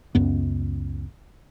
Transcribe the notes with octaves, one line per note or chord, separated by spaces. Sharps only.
C#2 F#2 B3